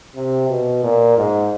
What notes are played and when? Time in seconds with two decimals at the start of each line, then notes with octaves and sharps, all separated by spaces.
0.15 C3
0.49 B2
0.83 A#2
1.17 G#2